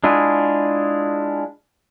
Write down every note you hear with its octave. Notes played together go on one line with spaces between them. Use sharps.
G#3 D4 E4 F4 G#4